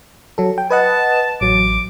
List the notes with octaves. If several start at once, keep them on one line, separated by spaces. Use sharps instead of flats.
F#3 A4
G5
B4 D#5 F#5 A5
A1 F#3 D6